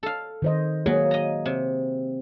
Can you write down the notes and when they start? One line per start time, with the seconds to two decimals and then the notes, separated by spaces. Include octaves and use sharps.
0.03 A4 F5
0.42 D#3 C5 D#5
0.86 F#3 A#3 G#4
1.11 D#5 A#5
1.46 C3